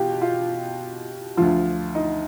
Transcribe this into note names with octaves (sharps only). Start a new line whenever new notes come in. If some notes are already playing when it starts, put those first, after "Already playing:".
Already playing: B2 F4 G4
F4
D2 D3 F3 F4
D#4